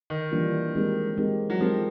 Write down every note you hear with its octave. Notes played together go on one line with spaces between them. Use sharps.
D#3
E3 G3 A#3 D4 F4
G#3 C4 D#4 G4 A#4
G#3 C4 D#4 G4 A#4
F#3
F3 G#3 C4 D#4 G4 A#4